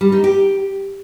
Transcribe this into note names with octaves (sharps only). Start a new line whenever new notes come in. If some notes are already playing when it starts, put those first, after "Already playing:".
G3
D#4
G4